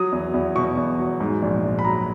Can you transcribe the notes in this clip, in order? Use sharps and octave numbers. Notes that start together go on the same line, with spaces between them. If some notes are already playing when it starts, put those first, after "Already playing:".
Already playing: F#3 D#6
E2
E2
B2 C#6
E2
F#3
G#2
A#1
A#1
B5
F#3 A#5